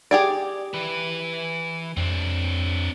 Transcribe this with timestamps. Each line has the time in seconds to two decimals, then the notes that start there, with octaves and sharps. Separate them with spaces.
0.11 G4 G#4 D5
0.74 E3 B4
1.97 F2 C4 D4